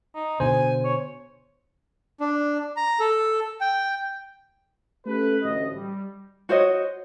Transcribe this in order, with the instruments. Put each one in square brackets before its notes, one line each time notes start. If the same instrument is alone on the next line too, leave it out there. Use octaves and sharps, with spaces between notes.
[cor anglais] D#4
[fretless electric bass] B2 D3 [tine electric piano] C5 [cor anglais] G#5
[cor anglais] C#5
[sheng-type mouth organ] D4
A#5
A4
G5
[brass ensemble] A3 C#4 G4 A4 B4
A1 D2 D#5
G3
[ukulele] F#4 C5 C#5 D#5